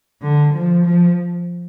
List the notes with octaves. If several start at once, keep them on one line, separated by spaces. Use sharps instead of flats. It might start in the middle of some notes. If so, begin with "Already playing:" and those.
D3
F3
F3